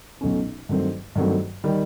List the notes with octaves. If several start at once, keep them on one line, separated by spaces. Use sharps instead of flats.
B1 B2 F#3 A3 C#4
G2 D#3 F#3 A3 C4
G2 D#3 F#3 A3 C4
D#3 G3